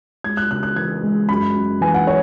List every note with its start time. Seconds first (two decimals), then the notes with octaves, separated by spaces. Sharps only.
0.24 G#3 G#6
0.37 F#6
0.51 C#3 F#6
0.63 F#6
0.76 E3 G#6
1.03 G#3
1.29 F#2 B5
1.55 F#2
1.81 E3 G#5
1.94 F#5
2.07 C#5